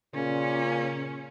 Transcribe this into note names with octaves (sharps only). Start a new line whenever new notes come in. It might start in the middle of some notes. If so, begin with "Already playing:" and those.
A#2 C#3 C#4